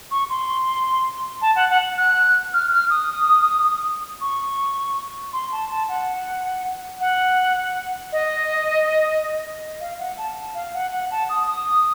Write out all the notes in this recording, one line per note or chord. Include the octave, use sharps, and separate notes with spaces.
C#6
C6
A5
F#5
F#5
F#6
F6
F6
D#6
C#6
C6
A5
A5
F#5
F#5
D#5
F5
F#5
A5
F5
F#5
F#5
A5
D#6
D#6